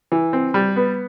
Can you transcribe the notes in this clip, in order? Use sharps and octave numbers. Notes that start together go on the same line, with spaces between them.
E3
C4
G3
B3